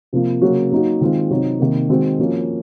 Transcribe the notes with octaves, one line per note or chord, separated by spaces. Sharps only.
C3 F3 A#3 F4
C#3 F#3 A#3 C#4 F#4
F#3 A#3 D#4 F#4
D#3 G#3 C4 F4
C3 F#3 C4 D#4
C3 D#3 A#3
D#3 G#3 C4 F#4
F3 A#3 C#4 F#4